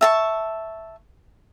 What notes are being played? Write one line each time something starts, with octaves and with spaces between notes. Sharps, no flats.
E5 A5 C#6